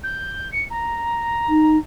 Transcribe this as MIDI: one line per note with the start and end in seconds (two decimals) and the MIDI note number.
0.03 0.50 91
0.52 0.64 97
0.70 1.78 82
1.49 1.78 63